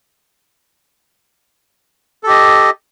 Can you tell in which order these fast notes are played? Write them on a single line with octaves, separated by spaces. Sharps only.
A4 G4 D#5